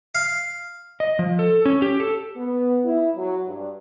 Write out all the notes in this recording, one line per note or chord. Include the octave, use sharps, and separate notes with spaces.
F5
D#5
F3
A4
C#4
G4
A4
B3
E4
F#3
G2